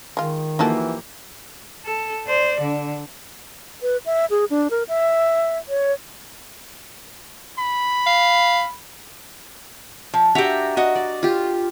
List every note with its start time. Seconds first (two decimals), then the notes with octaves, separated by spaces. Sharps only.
0.17 D#3 G#3 F4
0.59 E3 F3 A#3 D#4 F#4 G4 A4
1.85 A4
2.26 C5 D5
2.60 D3
3.82 B4
4.06 E5
4.30 G#4
4.50 D4
4.71 A#4
4.88 E5
5.69 C#5
7.59 B5
8.06 F5
10.14 F3
10.35 D4 F#4 G4 E5 A#5
10.77 F#4 D#5
10.95 D5
11.23 F4 G4